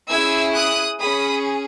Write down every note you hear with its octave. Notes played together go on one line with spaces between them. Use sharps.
C#4 E4 G#4 E6 G#6
D#6 F#6
C#4 G#4 B5 D#6